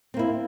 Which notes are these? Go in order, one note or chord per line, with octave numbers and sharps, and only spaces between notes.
A#3 C4 E4